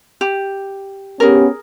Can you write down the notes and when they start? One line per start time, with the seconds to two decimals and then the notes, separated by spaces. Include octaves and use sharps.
0.21 G4
1.20 B3 C#4 G4 G#4 A#4